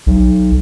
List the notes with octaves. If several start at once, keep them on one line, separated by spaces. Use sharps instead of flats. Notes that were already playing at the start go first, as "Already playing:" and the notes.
B1